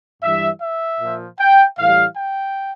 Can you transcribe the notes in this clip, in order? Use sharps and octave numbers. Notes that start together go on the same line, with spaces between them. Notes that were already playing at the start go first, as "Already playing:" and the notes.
G2 E3 G3 E5
E5
A#2 F3
G5
A2 E3 G3 F5
G5